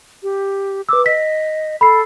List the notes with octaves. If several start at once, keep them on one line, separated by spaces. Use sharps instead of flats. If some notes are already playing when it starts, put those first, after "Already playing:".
G4
B4 D6 E6
D#5 B6
A4 B5 C7